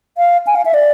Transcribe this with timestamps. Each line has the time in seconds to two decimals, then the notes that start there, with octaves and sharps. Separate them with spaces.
0.18 F5
0.47 G#5
0.55 F5
0.65 E5
0.74 D5